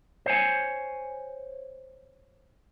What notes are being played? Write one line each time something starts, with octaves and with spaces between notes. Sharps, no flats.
C5 C#5 G#5